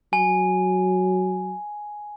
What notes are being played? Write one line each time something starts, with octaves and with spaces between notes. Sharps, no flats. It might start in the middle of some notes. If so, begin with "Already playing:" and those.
F#3 G#5